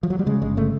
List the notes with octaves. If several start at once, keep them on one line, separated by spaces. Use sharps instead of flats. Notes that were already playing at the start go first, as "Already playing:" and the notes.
F3
F#3
G3
C#3 G#3
G1 G#3
C#3 A3